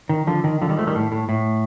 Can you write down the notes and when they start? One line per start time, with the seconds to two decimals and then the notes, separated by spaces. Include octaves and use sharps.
0.09 D#3
0.27 D3 F3
0.44 D#3
0.62 D3 F3
0.69 D#3 G3
0.78 F3 A3
0.87 D#3 G3
0.95 A2
1.12 A2
1.29 A2